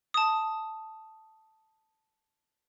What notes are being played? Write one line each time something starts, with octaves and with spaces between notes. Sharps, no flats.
A5 D#6